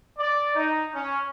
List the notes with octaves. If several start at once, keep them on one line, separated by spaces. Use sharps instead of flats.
D5
D#4
C#4